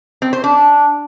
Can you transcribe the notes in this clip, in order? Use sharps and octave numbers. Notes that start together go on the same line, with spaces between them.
C4
C5
D4